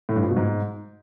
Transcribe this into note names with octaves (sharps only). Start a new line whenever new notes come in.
A2
G2
F3
B2
G#2